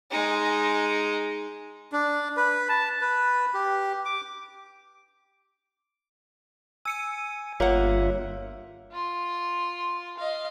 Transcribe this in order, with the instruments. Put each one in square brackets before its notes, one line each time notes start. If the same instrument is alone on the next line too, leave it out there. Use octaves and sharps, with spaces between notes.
[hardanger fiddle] G#3 D#4
[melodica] D4
B4
A5
B4
G4
D6
[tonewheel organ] G#5 [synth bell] E6 C#7 D#7
[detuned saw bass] G1 [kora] A#3 F#5 [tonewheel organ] F4 E5 [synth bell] C#5
[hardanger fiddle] F4 C6
D#5 F5